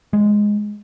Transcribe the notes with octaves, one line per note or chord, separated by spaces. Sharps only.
G#3